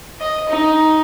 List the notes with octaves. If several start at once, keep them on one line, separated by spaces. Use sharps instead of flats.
D#5
D#4